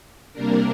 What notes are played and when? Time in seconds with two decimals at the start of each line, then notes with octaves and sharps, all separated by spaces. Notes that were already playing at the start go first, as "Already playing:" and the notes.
0.33 C3 G3 A#3 D4 A#4